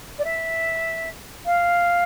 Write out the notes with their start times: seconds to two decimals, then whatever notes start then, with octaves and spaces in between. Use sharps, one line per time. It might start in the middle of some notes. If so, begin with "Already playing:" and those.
0.18 D5
0.24 E5
1.46 F5